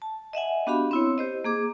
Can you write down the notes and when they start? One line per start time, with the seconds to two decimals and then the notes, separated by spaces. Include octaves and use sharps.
0.02 A5
0.33 D#5 E5 F#5 G#5
0.67 B3 D4 F#4 G4 F5 B5
0.91 C4 E4 C#5
1.18 G4 C5 D#5
1.44 A#3 G#4 D6